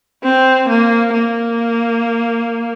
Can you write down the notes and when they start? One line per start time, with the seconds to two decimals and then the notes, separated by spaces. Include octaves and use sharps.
0.23 C4
0.69 A#3
1.14 A#3